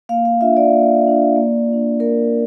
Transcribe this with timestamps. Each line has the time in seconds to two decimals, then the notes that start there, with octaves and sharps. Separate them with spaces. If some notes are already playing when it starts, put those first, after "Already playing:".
0.09 A#3 F5
0.25 F5
0.41 D4 F4 E5
0.57 D5
0.73 A#3
1.05 D4 F4
1.36 A#3
1.68 F4
1.73 D4
2.00 A#3 A#4